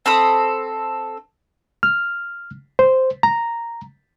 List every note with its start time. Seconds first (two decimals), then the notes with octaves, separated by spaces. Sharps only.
0.06 C4 A4 B5 D#6
1.83 F6
2.79 C5
3.23 A#5